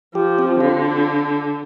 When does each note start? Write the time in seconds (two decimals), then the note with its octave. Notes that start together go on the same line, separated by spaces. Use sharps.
0.15 F3 G4
0.39 C4
0.61 D3 F4